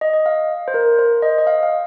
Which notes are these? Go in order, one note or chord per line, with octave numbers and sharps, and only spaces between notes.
D#5
D#5
F5
C5
A#4
C5
D#5
D#5
F5
F5